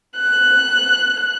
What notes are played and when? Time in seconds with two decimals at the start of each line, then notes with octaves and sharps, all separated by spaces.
0.18 F#6